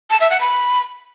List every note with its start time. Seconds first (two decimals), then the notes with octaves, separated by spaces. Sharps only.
0.10 A5
0.20 E5
0.31 F#5
0.41 B5